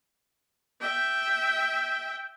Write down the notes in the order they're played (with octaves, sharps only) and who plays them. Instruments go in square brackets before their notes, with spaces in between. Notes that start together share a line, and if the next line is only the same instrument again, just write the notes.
[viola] E5 G5